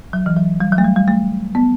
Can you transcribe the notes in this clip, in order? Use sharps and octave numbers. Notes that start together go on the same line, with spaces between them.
F#3
E3
F#3
G3
F#3
A3
G3
G3
A3
B3